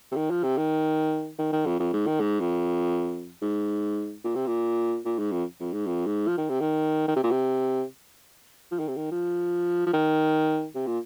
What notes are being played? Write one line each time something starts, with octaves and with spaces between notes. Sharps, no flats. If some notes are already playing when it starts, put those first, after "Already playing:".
C3
D#3
F3
C3
D#3
D#3
D#3
F2
F2
G#2
D#3
G#2
F2
G#2
A#2
C3
A#2
A#2
G#2
F2
F2
G#2
F2
G#2
F3
D#3
C3
D#3
D#3
C3
A#2
C3
F3
D#3
C3
D#3
F3
F3
D#3
C3
A#2